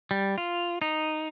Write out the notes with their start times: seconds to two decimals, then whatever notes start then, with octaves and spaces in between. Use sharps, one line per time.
0.11 G3
0.38 F4
0.82 D#4